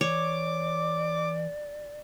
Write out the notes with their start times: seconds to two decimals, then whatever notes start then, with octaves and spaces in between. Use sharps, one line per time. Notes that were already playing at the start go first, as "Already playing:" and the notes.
0.01 E3 C#5 D5 D6